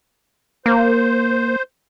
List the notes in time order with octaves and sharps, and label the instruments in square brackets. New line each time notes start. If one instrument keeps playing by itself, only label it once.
[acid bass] A#3 [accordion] C5